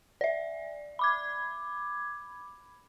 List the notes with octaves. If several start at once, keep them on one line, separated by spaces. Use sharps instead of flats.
D5 E5
B5 D6 G#6